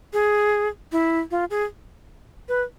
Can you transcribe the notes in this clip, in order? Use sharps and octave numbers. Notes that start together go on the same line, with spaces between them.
G#4
E4
F4
G#4
B4